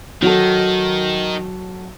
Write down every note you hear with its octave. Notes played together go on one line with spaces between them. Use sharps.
D#3 F#3 F#4 A4